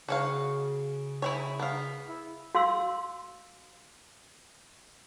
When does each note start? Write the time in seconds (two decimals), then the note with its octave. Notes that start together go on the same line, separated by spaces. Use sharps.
0.08 C#3 F#4 C#5 F5
1.22 E4 G#4 C#5
1.59 B3 F5
2.07 E4
2.55 F#4 F5 C6 E6